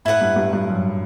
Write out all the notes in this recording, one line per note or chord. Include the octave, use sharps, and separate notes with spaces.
A2 E4 B4 F#5
G2
G2
G2
F#2